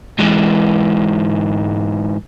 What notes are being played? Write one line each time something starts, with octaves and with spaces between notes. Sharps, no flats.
G#2 E3